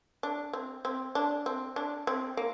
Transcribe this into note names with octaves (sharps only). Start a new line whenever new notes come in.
D4
C4
C4
D4
C4
D4
C4
A#3